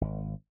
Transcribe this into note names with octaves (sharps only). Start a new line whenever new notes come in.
G#1